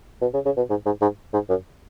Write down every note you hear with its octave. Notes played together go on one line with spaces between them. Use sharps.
B2
C#3
C#3
B2
G#2
G#2
G#2
G#2
F#2